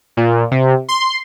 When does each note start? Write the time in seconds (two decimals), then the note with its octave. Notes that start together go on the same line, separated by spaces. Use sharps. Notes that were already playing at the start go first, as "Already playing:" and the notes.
0.17 A#2
0.51 C3
0.89 C6